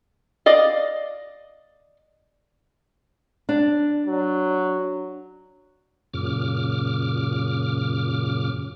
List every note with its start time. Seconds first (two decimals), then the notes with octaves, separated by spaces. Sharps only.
0.46 D5 D#5 F5
3.49 D4
4.06 F#3
6.14 F#2 A#2 C#3 D6 F6